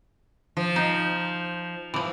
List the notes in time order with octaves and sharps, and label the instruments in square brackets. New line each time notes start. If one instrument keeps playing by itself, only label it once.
[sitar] F3
[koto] D#4
E3 F3